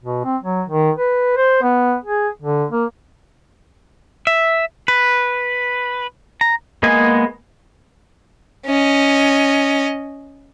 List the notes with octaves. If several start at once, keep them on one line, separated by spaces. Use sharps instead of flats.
B2
C4
F#3
D#3
B4
C5
B3
G#4
D3
A#3
E5
B4
A#5
G#3 A#3 B3 D#5 G#5
C#4 D#5